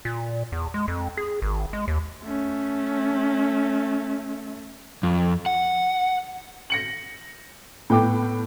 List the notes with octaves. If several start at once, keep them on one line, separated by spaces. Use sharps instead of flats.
A#2
E2
G#3
F2
G#4
G#1
G#3
D#2
A3 C#4
F2
F#5
A#6 C#7 F#7
A2 B3 G5 D6